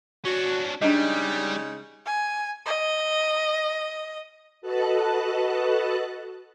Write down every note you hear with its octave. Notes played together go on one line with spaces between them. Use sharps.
C#4 D4 F#4
C#3 G3 G#3 D4 D#4 D#5
G#5
D#5
F#4 A4 B4 D#5 A5 F#6